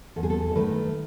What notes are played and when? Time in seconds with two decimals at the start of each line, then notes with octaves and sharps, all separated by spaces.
0.16 E2 A4
0.23 G#4
0.30 A4
0.55 D#3 A3 B4